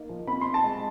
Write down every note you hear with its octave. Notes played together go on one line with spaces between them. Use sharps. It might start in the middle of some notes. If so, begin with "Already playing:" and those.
Already playing: A#3 D#4
F3
C4 B5
D#4 C6
A5
G#3